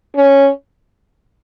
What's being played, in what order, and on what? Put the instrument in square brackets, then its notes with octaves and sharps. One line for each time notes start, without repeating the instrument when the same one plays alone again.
[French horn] C#4